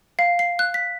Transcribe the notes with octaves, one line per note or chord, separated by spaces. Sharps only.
F5
C7
F#6
B6